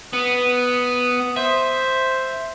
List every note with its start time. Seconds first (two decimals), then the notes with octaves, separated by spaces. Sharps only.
0.13 B3 D#6
1.36 C5 E5